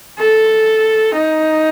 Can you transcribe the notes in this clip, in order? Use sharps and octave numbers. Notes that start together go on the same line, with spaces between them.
A4
D#4